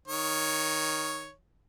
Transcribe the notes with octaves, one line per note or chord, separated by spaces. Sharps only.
D#3 C#5